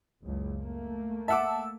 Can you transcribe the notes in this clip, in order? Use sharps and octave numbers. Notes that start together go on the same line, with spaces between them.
F#1 C#2
A3 A#3
E5 F#5 A5 D6 E6